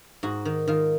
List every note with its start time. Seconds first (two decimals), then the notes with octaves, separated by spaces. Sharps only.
0.23 G#2 F#4
0.45 D#3
0.68 D#3 F4